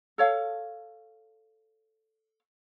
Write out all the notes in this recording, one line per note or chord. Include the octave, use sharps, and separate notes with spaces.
A4 C#5 F5